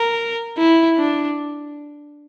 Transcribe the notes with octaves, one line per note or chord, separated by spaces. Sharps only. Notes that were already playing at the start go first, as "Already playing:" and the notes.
Already playing: A#4
E4
D4